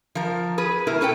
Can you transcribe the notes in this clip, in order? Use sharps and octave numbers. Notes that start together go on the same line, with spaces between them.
F3 A#4
G#4 B4
B2 E4 A#4
C#4 A4 B4 G5